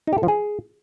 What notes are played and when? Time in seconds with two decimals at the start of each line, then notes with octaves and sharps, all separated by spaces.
0.07 D#4
0.13 G4
0.18 A4
0.23 F3
0.28 G#4